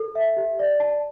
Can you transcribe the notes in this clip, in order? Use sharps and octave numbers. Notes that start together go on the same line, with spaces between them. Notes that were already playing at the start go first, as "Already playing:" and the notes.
Already playing: A4
E5
G4
D5
A5